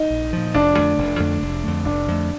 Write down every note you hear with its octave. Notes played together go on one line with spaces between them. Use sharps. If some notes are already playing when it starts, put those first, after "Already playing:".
Already playing: D#4
A#1
A#2 F3
F1 D4
F2 D3 A3
F1
F2 D3 A3
F1
F2 D3 A3
F1 D4
F2 D3 A3